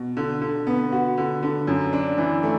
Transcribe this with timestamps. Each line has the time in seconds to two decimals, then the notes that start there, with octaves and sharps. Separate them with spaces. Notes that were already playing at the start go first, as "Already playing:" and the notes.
Already playing: B2
0.17 D3
0.42 D3
0.67 B3
0.92 F#4
1.17 D3
1.43 D3
1.67 F#2
1.93 D4
2.18 E3
2.43 A3